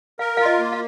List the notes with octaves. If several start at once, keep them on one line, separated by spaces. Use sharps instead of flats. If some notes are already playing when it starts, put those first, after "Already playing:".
A#4 F5
F4 F5
D#5
A#3
F5